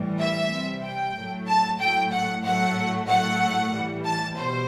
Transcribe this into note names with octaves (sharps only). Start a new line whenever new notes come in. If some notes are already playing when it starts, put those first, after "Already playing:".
Already playing: A2 E3 G3
E5
C3 G3
G5
A2 F#3 A3
A5
A2 F#3 A3 G5
F#5
A2 F#3 A3 F#5
A2 F#3 A3 F#5
A2 E3 G3
A5
B2 G3 C5